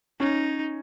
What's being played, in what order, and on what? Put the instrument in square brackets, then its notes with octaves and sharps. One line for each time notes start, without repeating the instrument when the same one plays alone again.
[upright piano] C#4 [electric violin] D#4